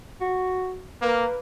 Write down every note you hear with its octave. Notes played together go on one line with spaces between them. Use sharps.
F#4
A#3 B4